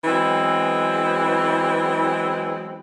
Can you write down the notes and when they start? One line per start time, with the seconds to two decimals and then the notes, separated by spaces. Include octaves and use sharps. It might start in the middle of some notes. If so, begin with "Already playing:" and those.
0.05 E3 F#3 G#3 B3 C4